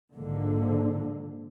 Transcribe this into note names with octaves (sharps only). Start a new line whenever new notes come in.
A#1 G#2 D3 A#3